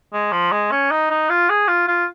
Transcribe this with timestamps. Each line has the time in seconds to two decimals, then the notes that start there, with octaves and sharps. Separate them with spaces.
0.13 G#3
0.32 F3
0.52 G#3
0.71 C#4
0.91 D#4
1.10 D#4
1.29 F4
1.49 G#4
1.68 F4
1.88 F4